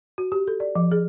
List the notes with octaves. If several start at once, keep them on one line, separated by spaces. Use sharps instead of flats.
F#4
G4
A4
D5
F3
G#4